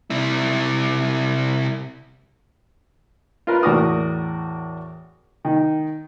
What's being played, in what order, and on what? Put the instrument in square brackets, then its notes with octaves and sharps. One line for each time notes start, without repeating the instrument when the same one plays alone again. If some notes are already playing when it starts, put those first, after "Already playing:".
[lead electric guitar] C3 E4
[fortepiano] F4 A#4 B4
E2 A2 F#4 A#4 D6 D#6
D#3